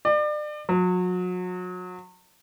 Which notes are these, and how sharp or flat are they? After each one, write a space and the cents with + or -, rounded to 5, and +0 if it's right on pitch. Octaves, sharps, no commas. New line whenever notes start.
D5 +35
F#3 -35